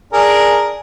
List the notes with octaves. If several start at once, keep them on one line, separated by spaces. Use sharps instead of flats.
D4 G#4 A#4